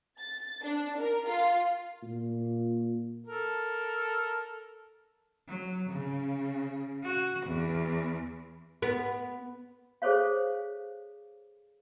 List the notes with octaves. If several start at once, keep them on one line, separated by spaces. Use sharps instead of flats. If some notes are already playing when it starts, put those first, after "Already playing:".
A6
D4
A#4
F4
A#2
A4 A#4
F#3
C#3
F#4
E2
B3
G#4 A4 C5 C#5 F5